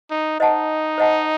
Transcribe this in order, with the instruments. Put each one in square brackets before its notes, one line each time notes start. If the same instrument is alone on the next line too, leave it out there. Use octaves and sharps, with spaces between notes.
[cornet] D#4
[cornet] D#4 [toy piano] C5 D#5 F#5 A5
[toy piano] C5 D#5 F#5 A5